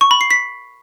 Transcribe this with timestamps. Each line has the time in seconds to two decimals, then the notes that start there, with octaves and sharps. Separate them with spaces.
0.01 C#6
0.11 B5
0.21 C7
0.31 B6